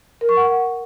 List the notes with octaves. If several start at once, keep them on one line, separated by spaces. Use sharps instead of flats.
A#4
C#6
F#5